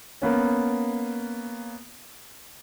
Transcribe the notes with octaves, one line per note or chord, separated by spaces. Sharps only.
A#3 B3 C#4